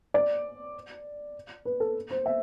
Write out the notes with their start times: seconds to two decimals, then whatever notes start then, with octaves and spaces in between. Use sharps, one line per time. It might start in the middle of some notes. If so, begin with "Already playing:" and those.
0.14 D5
1.65 B4
1.80 A4
2.11 C5
2.26 E5